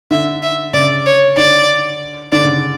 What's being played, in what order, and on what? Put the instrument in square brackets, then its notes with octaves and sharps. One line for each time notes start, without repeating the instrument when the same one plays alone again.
[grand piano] D3 [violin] E5
[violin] E5
[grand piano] C#3 [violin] D5
[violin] C#5
[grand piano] D3 [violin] D5
[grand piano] D3 [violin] D5
[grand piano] C#3